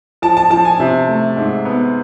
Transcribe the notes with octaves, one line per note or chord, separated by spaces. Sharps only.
F3 A5
A5
F3 A5
G#5
C3
A3
G#2
B3